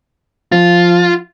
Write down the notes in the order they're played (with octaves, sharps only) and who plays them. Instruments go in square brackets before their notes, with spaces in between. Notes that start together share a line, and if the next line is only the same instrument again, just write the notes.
[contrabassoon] F3 [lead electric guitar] F4